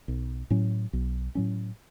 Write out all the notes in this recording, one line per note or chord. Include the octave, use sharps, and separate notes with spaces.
B1
A2 F#3 C#4
B1
A2 F#3 C#4